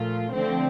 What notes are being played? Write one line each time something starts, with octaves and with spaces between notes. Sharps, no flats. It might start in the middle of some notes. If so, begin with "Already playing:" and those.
Already playing: A#2 F3 A3 F4
D3 F3 A3 C4